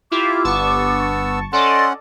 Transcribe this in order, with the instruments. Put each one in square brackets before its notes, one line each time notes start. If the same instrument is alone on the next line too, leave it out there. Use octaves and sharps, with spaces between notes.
[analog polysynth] E4 F4 G4 [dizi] D6
[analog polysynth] G1 A5 C#6 [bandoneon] B3 E6
[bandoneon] C#4 F#5 [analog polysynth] A4 D5 D#5 [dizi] C6